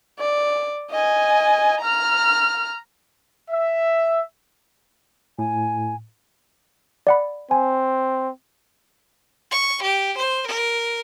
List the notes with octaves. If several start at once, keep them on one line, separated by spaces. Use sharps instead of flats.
D5
D#5 G#5
A#5 F6
E5
A2 G#5
D5 F#5 B5
C4 G#5
C#6
G4
C5
A#4